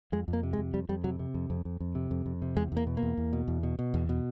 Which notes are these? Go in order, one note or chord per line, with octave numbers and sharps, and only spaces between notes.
F2 G#3
F2
A#3
C3
G#3
F2
F2 G3
F2 G3
C3 F#3
C3
F2
F2
F2
F2
C3
F2
F2
C3
E2 G#3
E2 A#3
B2
A#3
E2
E2
B2
E2
B2
B2
E2
B2